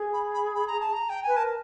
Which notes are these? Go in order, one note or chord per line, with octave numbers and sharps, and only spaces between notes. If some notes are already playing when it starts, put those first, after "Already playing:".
Already playing: G#4
B5
B5
B5
A#5
A5
A#5
G5
B4 G#5
A#4 A5